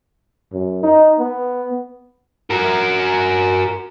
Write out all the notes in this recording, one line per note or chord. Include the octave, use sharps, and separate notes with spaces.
F#2
D#4
B3
F#4 A#4